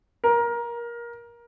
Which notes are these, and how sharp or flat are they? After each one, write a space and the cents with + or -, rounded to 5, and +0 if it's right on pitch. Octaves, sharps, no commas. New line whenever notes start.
A#4 +20